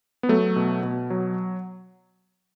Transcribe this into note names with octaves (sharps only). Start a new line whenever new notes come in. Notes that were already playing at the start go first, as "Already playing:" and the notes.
B3
F#3 A3
B2
B2
F#3